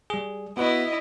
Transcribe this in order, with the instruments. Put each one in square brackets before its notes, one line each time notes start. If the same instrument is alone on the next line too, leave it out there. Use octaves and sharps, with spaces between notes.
[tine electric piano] G3 G#4
[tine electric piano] B3 F#4 B4 [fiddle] E4 [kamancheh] D#5